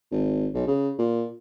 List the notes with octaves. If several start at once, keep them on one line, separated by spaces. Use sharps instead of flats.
G#1
B1
C#3
A#2